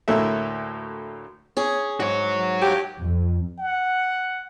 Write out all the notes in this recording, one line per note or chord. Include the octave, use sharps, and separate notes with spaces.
D2 A2 A#3 A4 E5
C#4 G#4
G#2 F#4 C#5
G4
F2
F#5